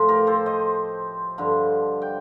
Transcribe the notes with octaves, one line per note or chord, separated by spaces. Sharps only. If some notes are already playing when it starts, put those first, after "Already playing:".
Already playing: A2 F3 F4
G4 A#4
A4 C5
C5 D#5
G2 D3 F3
G5